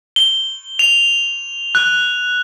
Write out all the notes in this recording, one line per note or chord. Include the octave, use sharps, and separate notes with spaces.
G7
F7
F#6